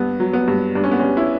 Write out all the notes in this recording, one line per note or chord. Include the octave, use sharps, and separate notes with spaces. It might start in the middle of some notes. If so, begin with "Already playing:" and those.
Already playing: G2 B3
F#3
B3
G2
G2 D4
C#4
B3
G2 C#4
C#4 E4